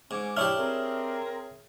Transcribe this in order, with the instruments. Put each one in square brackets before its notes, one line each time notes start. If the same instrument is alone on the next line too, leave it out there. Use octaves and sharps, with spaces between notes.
[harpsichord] G#2 [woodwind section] C#4 G#5 D6
[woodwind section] A2 F3 [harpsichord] D4 E4 G4 [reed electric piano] C#5 E5 F6
[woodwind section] C4 G#4 [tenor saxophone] A#4